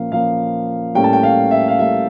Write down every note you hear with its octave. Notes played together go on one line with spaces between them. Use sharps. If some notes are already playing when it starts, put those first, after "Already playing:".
Already playing: A#2 F3 A#3 C#4 F5
A#2 F3 A#3 C#4 F5
A2 G3 A#3 C#4 G5
A5
G5
F5
E5
F5
A2 G3 A#3 C#4 E5